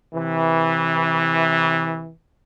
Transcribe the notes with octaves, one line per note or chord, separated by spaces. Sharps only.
C3 E3